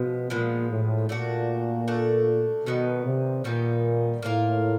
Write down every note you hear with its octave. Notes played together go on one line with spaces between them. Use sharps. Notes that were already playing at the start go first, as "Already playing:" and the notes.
Already playing: B2 F3 G#3 B3
A#2 F3 G#3 B3
A2
A#2 A3 D4 F#4
A3 D4 F#4
B2 D#3 G3 B3 D#4
C3
A#2 D#3 G3 B3 D#4
A2 A#3 C#4 F4 A#4